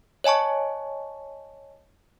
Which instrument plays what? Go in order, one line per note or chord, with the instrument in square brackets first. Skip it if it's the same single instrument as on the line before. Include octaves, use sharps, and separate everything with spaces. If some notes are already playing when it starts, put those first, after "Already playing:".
[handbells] C#5 D#5 G#5 A5 C#6